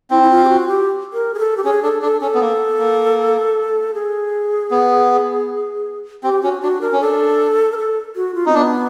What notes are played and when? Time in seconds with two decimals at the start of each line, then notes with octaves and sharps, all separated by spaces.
0.11 C4 E4
0.23 E4
0.30 F4
0.45 G4
0.49 F#4
0.68 G4
1.13 A#4
1.34 G#4
1.39 A4
1.57 G4
1.64 C#4 G#4
1.83 D4 A4
2.02 D4 A4
2.21 C#4 A4
2.34 B3
2.41 A#3
2.79 A#3
3.94 G#4
4.71 B3
6.24 C4 G4
6.43 C#4 F#4
6.62 D4 F#4
6.81 D4 A#4
6.92 C#4
7.01 D4 A4
7.72 A#4
7.78 A4
8.16 F#4
8.35 F4
8.46 C4 D#4
8.54 B3 D4